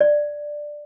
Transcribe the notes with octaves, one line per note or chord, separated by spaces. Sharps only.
D5